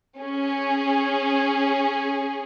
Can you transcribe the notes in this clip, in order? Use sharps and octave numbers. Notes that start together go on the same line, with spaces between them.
C#4 G#4